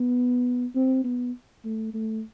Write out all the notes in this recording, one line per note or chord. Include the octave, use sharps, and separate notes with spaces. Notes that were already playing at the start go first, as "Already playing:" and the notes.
Already playing: B3
C4
B3
A3
A3